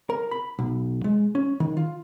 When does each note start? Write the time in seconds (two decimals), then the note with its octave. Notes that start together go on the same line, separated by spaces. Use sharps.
0.10 A#4
0.31 B5
0.59 B1
1.04 G#3
1.35 C#4
1.60 D#3
1.77 F4